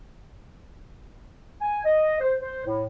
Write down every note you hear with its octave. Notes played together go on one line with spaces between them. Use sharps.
G#5
D#5
C5
C5
A2